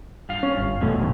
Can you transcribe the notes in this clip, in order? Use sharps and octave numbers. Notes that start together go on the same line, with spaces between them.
G2 F4 F5
C#4
G1
E2 B2 A3 C#4
D1 A#1 D#2